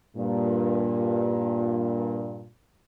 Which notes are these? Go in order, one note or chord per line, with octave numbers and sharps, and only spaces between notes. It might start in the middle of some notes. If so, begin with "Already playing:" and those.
G2 A#2